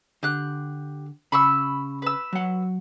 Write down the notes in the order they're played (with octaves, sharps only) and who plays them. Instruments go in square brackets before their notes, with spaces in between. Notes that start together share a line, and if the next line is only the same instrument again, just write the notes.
[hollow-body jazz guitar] D3 [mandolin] G4 F#6
[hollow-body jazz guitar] C#3 [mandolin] B5 C#6 E6
[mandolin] B4 E6
[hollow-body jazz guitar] F#3 F#5